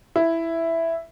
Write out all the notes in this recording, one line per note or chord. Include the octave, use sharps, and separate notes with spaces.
E4